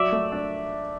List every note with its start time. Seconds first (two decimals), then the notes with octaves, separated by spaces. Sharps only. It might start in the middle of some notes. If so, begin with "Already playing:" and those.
Already playing: F#3 D5 E5
0.12 A3
0.32 D4